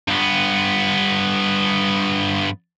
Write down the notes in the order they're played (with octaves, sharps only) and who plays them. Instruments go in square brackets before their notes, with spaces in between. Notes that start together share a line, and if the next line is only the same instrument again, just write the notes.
[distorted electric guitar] G2 B3